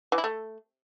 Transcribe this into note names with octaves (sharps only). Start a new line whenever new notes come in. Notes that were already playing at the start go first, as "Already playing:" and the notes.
E3
E4
A3